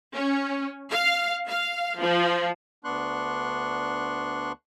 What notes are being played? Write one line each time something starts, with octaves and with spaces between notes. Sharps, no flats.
C#4
F5
F5
F3
D2 B3 D4 C6 C#6 F#6